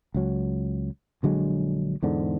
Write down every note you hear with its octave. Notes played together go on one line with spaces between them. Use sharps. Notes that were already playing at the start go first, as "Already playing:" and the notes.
C#2 F#3
A#1 D3 F#3 G#3
E2 G#2 D3